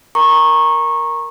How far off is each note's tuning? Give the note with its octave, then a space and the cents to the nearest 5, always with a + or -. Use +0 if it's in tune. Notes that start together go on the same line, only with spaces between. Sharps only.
A#4 +0 A#5 +0 C#6 -20